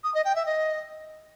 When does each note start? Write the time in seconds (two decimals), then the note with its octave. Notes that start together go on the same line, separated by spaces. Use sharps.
0.03 D#6
0.14 D#5
0.24 G5
0.35 E5
0.45 D#5